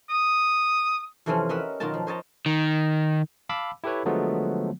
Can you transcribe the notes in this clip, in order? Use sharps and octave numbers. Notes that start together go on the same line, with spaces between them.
D#6
F2 C3 E3 F3 C4 C#4
C#4 A#4 D#5 E5 F#5 B5
B2 D#3 F#3 F4 A#4 A5
F3
C5 C#5 D#5 G5 A5 A#5
D#3
F5 A5 B5 D6 E6
E4 G4 A4 B4 C#5
D3 F3 F#3 G#3 A3 B3